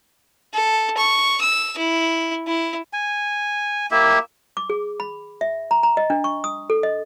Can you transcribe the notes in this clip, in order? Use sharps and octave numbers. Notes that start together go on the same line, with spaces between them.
A4
C#6
E6
E4
E4
G#5
A#3 E4 G4 E5
D6
G#4
B5
E5
A#5
A#5
D#5
D4
C#6
D#6
A4
D#5